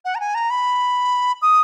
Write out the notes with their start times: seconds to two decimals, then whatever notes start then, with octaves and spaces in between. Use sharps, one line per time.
0.05 F#5
0.15 A#5
0.20 G#5
0.35 A#5
0.50 B5
1.42 D#6